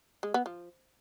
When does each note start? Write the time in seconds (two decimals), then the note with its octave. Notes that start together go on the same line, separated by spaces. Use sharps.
0.23 G#3
0.34 B3
0.46 F3